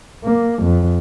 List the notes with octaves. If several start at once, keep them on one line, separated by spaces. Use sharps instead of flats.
A#3
F2